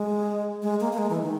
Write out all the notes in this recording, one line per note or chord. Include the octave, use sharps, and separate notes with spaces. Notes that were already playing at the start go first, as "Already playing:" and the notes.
Already playing: G#3
G#3
A#3
A#3
G#3
E3
D#3